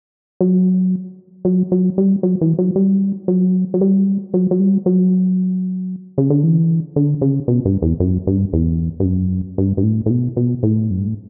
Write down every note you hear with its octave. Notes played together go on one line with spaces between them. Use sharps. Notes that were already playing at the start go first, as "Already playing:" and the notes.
F#3
F#3
F#3
G3
F#3
E3
F#3
G3
F#3
F#3
G3
F#3
F#3
G3
F#3
C#3
D3
E3
D3
C#3
B2
G2
E2
F#2
G2
E2
G2
F#2
G2
G2
A2
A2
B2
B2
A2
F#2
G2
A2